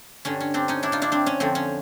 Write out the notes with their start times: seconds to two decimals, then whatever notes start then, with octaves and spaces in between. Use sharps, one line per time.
0.25 G2 D3 G3 C#4
0.40 C#4
0.54 C4 D4
0.68 C#4 D#4
0.83 D4 E4
0.92 D#4 F4
1.02 D4 E4
1.12 C4 D4
1.26 C#4
1.40 F2 D3 F3 C4
1.55 C#4